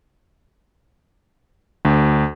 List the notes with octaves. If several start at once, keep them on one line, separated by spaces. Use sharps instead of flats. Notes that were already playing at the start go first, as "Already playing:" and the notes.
D2